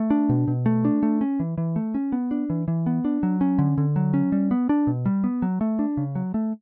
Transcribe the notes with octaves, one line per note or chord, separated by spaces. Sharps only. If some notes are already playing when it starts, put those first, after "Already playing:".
Already playing: A3
D4
B2
B2
A3
D4
A3
C#4
E3
E3
A3
C#4
B3
D4
E3
E3
B3
D4
F#3
C#4
D3
D3
F#3
C#4
G3
B3
D4
B2
G3
B3
F#3
A3
D4
C#3
F#3
A3